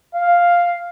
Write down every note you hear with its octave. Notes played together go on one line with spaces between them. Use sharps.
F5